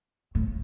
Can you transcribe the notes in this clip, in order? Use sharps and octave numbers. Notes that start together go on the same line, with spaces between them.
A2